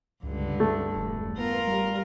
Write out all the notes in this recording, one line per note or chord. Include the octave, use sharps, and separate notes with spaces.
C#2 G2 D3
A3
E1
B3 F4 A#4
G3